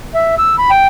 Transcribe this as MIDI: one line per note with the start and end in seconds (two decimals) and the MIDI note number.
0.15 0.35 76
0.38 0.56 88
0.58 0.71 83
0.71 0.87 79